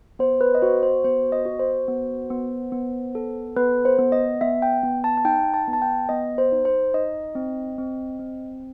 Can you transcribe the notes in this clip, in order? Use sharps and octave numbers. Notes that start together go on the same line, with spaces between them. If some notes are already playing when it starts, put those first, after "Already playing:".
B3 C5
B4
D#5
F#4 C5
C5
B3 C5
D#5
F#4
C5
B3
B3
B3
A4
B3 B4
C5
B3
D#5
B3 E5
G5
B3
A5
A5
D#4 G5
A5
B3
A5
G5
B3 D#5
C5
D#4
C5
D#4 D#5
C4
C4
C4